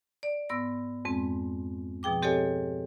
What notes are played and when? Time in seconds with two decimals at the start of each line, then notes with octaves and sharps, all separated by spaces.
0.23 D5
0.49 G#2 B3 E6 A#6
1.05 F2 G#2 G#3 C4
2.03 B2 F3 G#4 G5 D6
2.22 C4 G4 A4 C#5 D#5 G#5